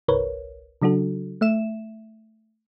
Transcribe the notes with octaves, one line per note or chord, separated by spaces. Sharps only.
G1 C2 A#4 B4 C#5
C#3 F#3 D4 F#4 A4
A3 E5 E7